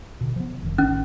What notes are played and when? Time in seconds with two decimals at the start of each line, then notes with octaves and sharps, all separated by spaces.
0.21 B2 D3
0.36 F3 B3
0.63 F1 D#3
0.78 A1 D#3 C#4